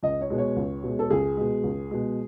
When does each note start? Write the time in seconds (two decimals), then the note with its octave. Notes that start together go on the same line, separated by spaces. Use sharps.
0.03 C#2 D#5
0.21 C#5
0.30 B2 G#3
0.38 C#5
0.56 C#2
0.84 B2 G#3
0.99 A4
1.10 C#2 G#4
1.37 B2 G#3
1.63 C#2
1.91 B2 G#3